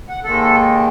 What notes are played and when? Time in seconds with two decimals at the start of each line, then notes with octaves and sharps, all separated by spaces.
0.09 F#5
0.24 D#2 D#3 G#3 A4